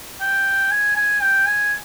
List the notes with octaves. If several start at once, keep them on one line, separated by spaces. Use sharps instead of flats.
G5
G#5
G#5
G5
G#5